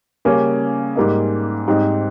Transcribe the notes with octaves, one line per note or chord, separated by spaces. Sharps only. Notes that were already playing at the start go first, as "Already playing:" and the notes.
C#3 G3 A#3 C#4
G#2 G3 A#3 D#4
G#2 G3 C4 D#4